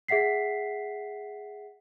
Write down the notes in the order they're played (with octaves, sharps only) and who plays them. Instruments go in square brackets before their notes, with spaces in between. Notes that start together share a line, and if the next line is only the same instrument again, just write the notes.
[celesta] G#4 E5 F#5 B6 C7